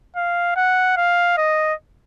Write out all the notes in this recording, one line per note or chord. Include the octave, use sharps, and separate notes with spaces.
F5
F#5
F5
D#5